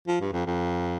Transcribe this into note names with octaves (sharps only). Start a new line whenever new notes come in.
F3
G2
F2
F2